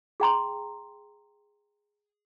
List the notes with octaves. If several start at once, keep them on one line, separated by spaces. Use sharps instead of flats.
G#4 G5 A#5 C6